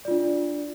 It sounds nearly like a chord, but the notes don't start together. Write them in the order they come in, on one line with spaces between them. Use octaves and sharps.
D5 F4 D4